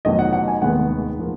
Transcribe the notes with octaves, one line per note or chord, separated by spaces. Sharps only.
F1 F2 D#3 F#3 B3 D#5
F#5
F#5
G#5
F1 D#2 D#3 G#3 B3 F#5
F3 A#3